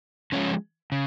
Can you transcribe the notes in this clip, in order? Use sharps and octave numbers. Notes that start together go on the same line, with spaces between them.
D3 F3 G#3 C#4
C#3